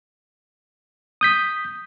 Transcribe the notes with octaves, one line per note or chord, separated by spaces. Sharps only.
D#6 G6 B6